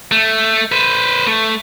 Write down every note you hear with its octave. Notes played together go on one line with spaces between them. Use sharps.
A3
B4 C5
A3